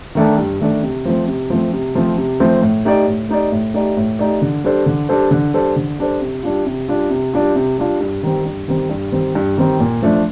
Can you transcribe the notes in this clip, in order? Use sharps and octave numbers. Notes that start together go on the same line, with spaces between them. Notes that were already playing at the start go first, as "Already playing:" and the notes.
D#3 A3 D4 A4
G2
D#3 A3 D4 A4
C3
F3 A3 C4
C3
F3 A3 C4
C3
F3 A3 C4
C3
F3 A3 C4
A2
A3 D#4 G4 D5
A2
A3 D#4 G4 D5
A2
A3 D#4 G4 D5
A2
A3 D#4 G4 D5
D3
G3 D4 A4 C5
D3
G3 D4 A4 C5
D3
G3 D4 A4 C5
D3
G3 D4 A4 C5
C3
G3 D4 F4
C3
G3 D4 F4
C3
G3 D4 F4
C3
G3 D4 F4
G2
D#3 G3 C4
G2
D#3 G3 C4
G2
D#3 G3 C4
G2
D#3 G3 C4
A#2
F3 A3 D4